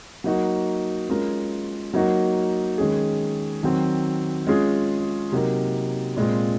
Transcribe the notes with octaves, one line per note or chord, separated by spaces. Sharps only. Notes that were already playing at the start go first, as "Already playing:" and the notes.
F#3 A#3 D#4 F#4
G#3 C#4 F4 A#4
F#3 A#3 D#4 F#4
D#3 G#3 C#4 G#4
D#3 F#3 C4
G#3 C#4 F4 G#4
C3 F#3 A#3 D#4 A#4
A#2 G#3 C4 F4